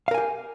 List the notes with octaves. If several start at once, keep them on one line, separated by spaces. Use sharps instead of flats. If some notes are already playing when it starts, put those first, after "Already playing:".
G4 A#4 F5 G#5